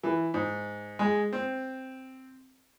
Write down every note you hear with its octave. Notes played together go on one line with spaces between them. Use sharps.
E3
G#2
G#3
C4